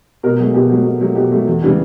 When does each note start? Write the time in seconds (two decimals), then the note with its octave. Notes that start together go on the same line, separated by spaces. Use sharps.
0.23 B2 A#4
0.39 F#3 G#4
0.42 A3
0.54 B2 G4
0.70 F#3 A3
0.85 B2
1.00 F#3 A3
1.15 B2 G4
1.32 F#3 A3
1.47 E2
1.62 C#3 E3 G3